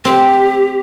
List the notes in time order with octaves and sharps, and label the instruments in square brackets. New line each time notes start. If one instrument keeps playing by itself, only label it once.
[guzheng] C4 [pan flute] G4